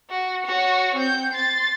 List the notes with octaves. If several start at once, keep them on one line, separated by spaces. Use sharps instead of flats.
F#4
F#4 C#5
C4 G6
C6 A6